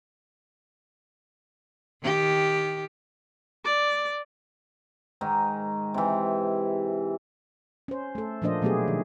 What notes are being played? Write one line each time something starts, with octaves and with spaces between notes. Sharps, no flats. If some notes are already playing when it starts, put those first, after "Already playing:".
D#3 G4
D5
G#2 D#3 D#4
C3 E3
C#4 C5
A3 A4
A#2 F3 A#3 D4 C5 D#5
B2 F#3 A3 B3 G4 G#4
D#3